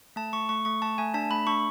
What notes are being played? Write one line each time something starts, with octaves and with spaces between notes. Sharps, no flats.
A3 A5
A3 C#6
A3 C#6
A3 C#6
A3 A5
A3 G#5
D4 A5
A3 B5
D4 C#6